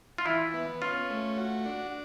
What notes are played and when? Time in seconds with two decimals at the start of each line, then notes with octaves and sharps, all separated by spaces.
0.18 F4
0.26 E3 E4
0.53 B3
0.81 C#4 F4
1.10 A3
1.37 F#4
1.65 D4